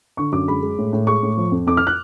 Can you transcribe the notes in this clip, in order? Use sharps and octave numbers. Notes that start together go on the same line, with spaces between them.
D3 C#6
F#2 D6
G#3 B5
G#3
A2
A2
G#3 C#6
A2
F3
F2
F2 D6
F6
F#6